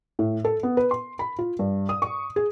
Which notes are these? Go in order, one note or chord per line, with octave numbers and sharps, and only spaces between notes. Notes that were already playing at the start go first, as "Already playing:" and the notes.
A2
A4
B3
B4
C6
B5
F4
G2
D#6
C#6
G#4